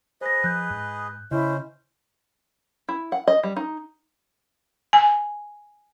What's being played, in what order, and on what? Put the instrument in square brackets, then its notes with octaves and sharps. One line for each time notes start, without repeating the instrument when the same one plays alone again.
[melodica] G#4 B4 D#5 [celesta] C5 A#6
[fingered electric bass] F3 [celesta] F#6 G6
[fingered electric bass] G#2
[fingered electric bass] C#3 [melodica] C#4 C5 [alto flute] E4 [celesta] D#5
[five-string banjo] E4
F#5
D#5
G3
D#4
[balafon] G#5